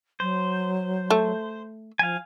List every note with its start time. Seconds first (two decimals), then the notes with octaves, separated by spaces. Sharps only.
0.20 F#3 C5
1.10 A3
1.99 F3 F5 G#5